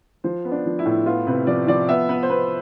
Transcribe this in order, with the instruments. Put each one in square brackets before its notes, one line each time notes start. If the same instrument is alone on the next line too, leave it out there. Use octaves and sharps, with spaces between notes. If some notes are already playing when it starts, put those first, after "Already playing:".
[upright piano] F3 C5
B3
D4
F3
E4
A2
B3 F4
C3 B4
F3 D5
F3 D5
B3 E5
B3 B4
C5
B3 B4